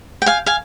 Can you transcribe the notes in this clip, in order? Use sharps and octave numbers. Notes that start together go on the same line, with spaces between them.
G5
F5 G#5
F5 G#5